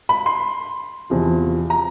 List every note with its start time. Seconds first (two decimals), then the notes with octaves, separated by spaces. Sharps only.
0.09 B5
0.26 C6
1.10 E2 C3 F3
1.70 A#5